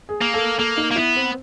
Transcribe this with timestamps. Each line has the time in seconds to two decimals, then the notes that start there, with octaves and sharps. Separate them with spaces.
0.09 G#4
0.21 A#3
0.34 A4
0.59 A#3 A4
0.77 D#4
0.91 A#3
0.96 B3 E4
1.16 C4